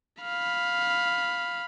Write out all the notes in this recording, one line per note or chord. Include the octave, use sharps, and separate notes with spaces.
F5 B5